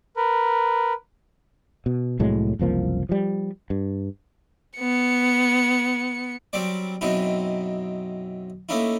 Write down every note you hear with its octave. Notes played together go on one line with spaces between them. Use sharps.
A#4 B4
B2
C2 A2 F#3 G#3
F#1 C2 F3 A#3
F3 G3
G2
B3 C#7
F#3 G3 C4 D5
F#2 B2 C4 D#4 E4
A3 A#3 C#4 D#4 E4